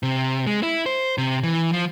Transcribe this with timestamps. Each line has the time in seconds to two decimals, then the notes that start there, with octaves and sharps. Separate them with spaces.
0.03 C3
0.46 G#3
0.63 E4
0.86 C5
1.18 C3
1.43 E3
1.72 F3